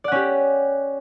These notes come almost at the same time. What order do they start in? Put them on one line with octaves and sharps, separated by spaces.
D5 F#5 C#4 G4